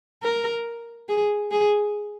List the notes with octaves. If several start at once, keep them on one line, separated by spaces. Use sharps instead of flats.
A#4
G#4
G#4